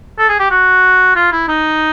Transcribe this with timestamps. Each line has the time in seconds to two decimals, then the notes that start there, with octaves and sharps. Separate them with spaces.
0.19 A4
0.28 G#4
0.39 G4
0.50 F#4
1.15 F4
1.32 E4
1.48 D#4